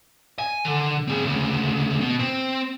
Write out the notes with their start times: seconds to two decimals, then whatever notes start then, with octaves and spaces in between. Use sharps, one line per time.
0.39 G#5
0.65 D3
1.08 C4 G#4
1.24 D2 C#3
2.00 B2
2.19 C4